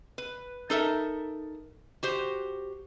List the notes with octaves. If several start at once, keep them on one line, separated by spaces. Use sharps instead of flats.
B4
D#4 A4 A#4 E5
F#4 G4 C5